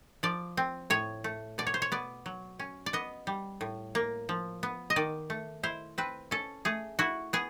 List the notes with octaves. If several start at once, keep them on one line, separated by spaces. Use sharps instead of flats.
F3 D5
C4
A2 C#5
A3
B2 D5
C#5
C5
C#5
B3 D5
F#3
C#4
D5
B3 D#5
G3
A2
A#3
F3
B3
D#5
D#3 D5
A3
E4 C5
C4 B4
C#4 A4
A3 G#4
E4 F#4
B3 G#4